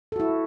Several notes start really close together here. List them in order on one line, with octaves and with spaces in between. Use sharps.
A4 F#4 E4